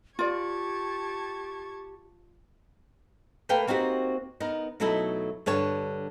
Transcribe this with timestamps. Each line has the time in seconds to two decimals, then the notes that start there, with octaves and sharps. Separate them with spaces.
0.19 F4 G4 D5 A5 C#6 G#6
3.49 A3 A#3 B4 F5 G5
3.67 A#3 C4 D#4 F#4 G4
4.40 B3 D#4 A#4
4.80 B2 F#3 A3 D#4 E4 A4
5.46 G2 D3 C#5 A5